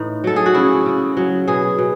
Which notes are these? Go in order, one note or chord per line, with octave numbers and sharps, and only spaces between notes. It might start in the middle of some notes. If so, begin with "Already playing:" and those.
Already playing: A2 E3 D#4
F#3 A4
G#4
F#4
C#3 E4
C#3
F#3
B2 G#4
B2